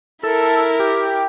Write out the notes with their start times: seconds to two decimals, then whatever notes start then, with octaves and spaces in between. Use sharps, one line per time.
0.23 E4 A4 A#4
0.79 G4